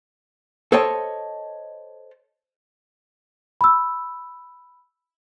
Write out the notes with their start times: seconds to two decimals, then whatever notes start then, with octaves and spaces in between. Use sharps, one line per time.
0.72 A4 C5 C#5 D#5 G5 A5
3.61 B5 E6